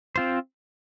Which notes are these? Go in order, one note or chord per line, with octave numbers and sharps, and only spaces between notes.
C4 F4 C5